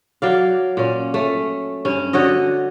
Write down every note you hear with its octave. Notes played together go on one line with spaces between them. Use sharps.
F#3 D5 F5
A#2 C#4
A3 C#4
G2 C#4
D3 F#4 C#5 D#5